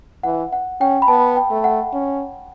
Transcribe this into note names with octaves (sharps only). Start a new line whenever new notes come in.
E3 F#5
F#5
C#4 G5
B5
B3 A5
G5
A3
F#5
C#4